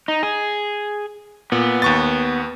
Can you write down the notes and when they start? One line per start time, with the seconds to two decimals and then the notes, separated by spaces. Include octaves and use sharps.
0.08 D#4
0.23 G#4
1.52 A#2 B3
1.82 D#2 C#6 A6